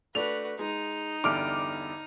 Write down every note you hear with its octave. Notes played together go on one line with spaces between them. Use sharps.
A3 D4 F#4 B4 F7
G#3 D#4
E2 G2 D3 D6 F6 D7